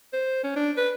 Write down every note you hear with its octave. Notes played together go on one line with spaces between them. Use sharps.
C5
C#4
D4
B4